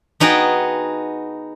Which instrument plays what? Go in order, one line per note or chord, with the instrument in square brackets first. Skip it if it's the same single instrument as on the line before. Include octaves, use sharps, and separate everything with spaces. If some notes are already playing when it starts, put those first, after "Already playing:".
[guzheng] B3 D#4 F#4 G#4 G5